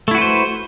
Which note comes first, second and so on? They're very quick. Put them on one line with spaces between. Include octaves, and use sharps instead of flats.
A3 E4 F#4 B4 C5